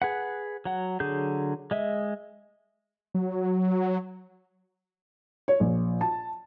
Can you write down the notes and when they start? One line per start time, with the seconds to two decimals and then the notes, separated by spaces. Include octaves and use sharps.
0.02 G#4 B4 F#5
0.65 F#3 F#5
1.00 D3 F#3 G#4 G6
1.71 G#3 D#5 E5
3.14 F#3
5.48 C#5
5.60 A#1
6.01 A5